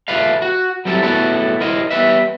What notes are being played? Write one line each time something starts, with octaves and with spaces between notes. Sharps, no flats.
F4 A4 B4 E5 F5
F#4
F#3 G3 C4 E4 A4
A2 B3 E4 F#4 A4
E4 A#4 C5 D#5
G3 B3 B4 E5